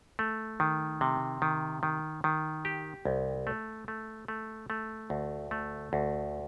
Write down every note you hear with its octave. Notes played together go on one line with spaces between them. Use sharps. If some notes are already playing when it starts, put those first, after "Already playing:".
A3
D#3
C3
D#3
D#3
D#3
G4
C2
A3
A3
A3
A3
D2
A3
D2